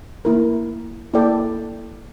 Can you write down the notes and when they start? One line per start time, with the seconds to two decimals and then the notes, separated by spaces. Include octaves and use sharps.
0.25 A#3 E4 A#4
1.14 A#3 E4 A4 D5 G5